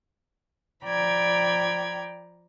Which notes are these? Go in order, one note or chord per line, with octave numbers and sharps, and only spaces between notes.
F3 D5 G5 A#5 B5 G#6